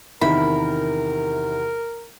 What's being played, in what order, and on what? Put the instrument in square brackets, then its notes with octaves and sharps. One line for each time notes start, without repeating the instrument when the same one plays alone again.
[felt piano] E2 C3 E5 [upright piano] D#3 [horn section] A#4 [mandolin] B5